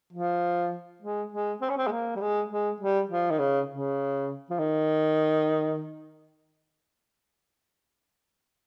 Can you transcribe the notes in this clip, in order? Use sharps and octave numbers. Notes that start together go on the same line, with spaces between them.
F3
G#3
G#3
C4
C#4
C4
G#3
A#3
G3
G#3
G#3
G3
F3
D#3
C#3
C#3
F3
D#3